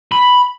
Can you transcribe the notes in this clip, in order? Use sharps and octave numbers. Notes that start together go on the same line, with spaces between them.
B5